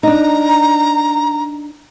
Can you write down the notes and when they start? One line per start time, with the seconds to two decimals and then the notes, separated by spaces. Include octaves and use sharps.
0.03 D4 D#4 A#5